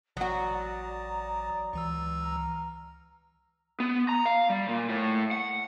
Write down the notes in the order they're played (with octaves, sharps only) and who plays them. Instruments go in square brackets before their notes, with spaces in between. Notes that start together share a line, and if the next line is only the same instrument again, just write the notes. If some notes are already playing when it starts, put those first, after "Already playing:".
[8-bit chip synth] A1 D#6 [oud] F#3 F#4 [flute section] D5 A#5
[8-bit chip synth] C#2 E3 E6
[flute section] A#5 F6
[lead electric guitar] B3
A#5
F5
G3
A#2
A2
F#5